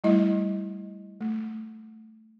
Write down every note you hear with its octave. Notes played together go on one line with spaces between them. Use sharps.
G3 A3 E4 D#5
A3